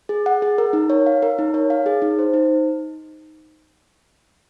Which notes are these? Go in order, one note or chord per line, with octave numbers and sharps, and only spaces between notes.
G#4
F#5
G#4
A#4
D#4
C#5
F5
A#4
D#4
C#5
F5
G#4
D#4
C5
D#4